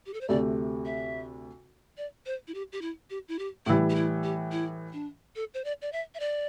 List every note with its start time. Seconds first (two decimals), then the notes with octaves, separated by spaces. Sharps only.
0.06 G4
0.14 A4
0.21 C5
0.29 D2 C3 A3 D5
0.85 E5
1.98 D5
2.26 C5
2.48 E4
2.54 G4
2.72 G4
2.81 E4
3.10 G4
3.28 E4
3.39 G4
3.66 A2 E3 G3 E4
3.90 G4
3.95 E4
4.24 G4
4.52 E4
4.93 D4
5.36 A4
5.54 C5
5.64 D5
5.82 D5
5.93 E5
6.15 E5
6.20 D5